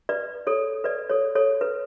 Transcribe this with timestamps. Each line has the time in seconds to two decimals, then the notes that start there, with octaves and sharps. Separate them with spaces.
0.09 B4 D5
0.47 A4 C#5
0.84 B4 D5
1.10 A4 C#5
1.35 A4 C#5
1.61 B4